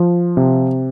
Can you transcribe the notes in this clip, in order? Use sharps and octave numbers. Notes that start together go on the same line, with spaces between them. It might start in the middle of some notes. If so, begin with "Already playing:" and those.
Already playing: F3
C3